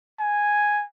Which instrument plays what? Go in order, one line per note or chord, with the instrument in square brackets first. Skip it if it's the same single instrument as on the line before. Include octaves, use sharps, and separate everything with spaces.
[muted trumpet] G#5